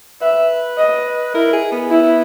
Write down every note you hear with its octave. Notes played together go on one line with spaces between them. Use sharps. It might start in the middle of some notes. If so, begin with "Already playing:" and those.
B4 E5
D#5
E4 A#4
G#4
B3
E4